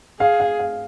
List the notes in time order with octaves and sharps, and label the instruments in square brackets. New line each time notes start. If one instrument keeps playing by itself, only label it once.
[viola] G#4 [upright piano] F5
[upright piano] F5
F5